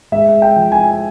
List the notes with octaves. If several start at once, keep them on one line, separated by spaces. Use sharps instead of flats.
G#3 E5
G5
F3
G#5